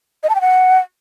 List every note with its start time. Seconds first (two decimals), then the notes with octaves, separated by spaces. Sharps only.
0.23 D#5
0.29 A5
0.35 G5
0.41 F#5